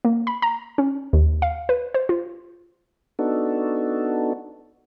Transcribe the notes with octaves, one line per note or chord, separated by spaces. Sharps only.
A#3
B5
A#5
C#4
D#2
F5
B4
C5
F4
B3 D4 D#4 F#4 A4